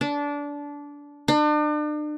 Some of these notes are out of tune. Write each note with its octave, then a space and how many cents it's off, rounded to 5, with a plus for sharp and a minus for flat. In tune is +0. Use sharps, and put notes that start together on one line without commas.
D4 -20
D4 +40